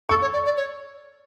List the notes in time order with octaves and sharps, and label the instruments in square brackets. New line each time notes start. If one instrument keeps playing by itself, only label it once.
[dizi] A4 [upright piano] C#6
[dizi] C#5
D5
D5
C#5